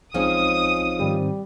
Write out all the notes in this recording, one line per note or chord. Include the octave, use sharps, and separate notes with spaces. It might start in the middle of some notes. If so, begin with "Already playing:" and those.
B1 F3 G#3 C4 C#4 D#4 D#6
G#2 D#3 G3 C4